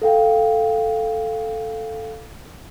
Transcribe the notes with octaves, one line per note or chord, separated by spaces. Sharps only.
A4 F5 G5